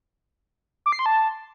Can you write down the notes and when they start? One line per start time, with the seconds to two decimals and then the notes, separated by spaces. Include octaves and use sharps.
0.86 D6
0.92 C7
0.99 C6
1.06 A5